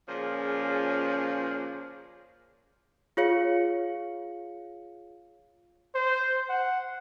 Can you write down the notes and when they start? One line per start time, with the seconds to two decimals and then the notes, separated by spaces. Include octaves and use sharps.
0.08 A#2 C#3 F3 C#4 G#4
3.17 F4 G#4 C#5 F5 C#7
5.95 C5
6.49 F#5